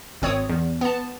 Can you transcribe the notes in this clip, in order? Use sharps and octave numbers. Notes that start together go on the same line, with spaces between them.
G#1 C4 C#5 D#6
E2
B3 A5